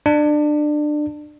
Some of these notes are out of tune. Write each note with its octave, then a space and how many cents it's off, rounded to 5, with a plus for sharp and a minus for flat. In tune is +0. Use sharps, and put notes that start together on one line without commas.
D4 +25